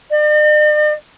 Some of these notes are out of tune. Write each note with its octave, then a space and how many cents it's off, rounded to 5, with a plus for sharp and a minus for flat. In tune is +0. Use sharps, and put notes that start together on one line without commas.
D5 +45